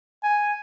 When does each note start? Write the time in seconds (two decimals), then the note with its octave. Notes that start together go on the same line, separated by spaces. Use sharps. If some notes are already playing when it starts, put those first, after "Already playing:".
0.23 G#5